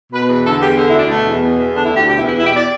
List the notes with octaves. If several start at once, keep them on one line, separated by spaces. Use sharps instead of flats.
B2 B4
B4
E2
B4
D3 A4
E2 G4
D3
E4
D2
D4
B2 A3
E2
B2
E2
D3 D4
E4
D2 G4
B2 G4
E4
E2
E4
B2 E4
G4
D5